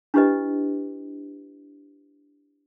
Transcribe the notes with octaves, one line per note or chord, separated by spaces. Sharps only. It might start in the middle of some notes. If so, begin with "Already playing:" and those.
D4 E4 G4 B4 D#5